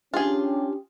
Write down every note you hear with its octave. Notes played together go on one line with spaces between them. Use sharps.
C#4 D4 F4 G4 G#4